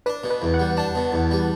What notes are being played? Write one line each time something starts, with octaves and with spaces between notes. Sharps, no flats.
D4 B4
B2
B4
E2
F#5
G3
D4 A5
B2
E2
G3